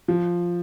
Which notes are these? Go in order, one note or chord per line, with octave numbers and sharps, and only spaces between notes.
F3